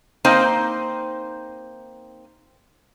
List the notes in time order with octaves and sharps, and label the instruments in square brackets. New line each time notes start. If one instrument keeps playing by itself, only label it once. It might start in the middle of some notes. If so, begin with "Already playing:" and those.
[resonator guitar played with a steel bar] A#3 C4 D#4 C5